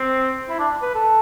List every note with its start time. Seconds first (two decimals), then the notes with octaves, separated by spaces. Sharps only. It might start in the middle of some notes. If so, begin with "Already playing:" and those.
Already playing: C4
0.50 E4
0.59 D4
0.82 B4
0.95 A4